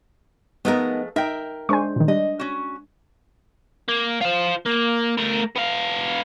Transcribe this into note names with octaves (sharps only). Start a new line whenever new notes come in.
F3 G#3 A3 B3 D#4 A#4
D#4 A#4 E5 G5
G#3 D4 C5 G#5 C#6
A#2 D#3
G3 D4 D#5
C#4 F#4
A#3
F4 C5
A#3
A3 A#4
B3 F5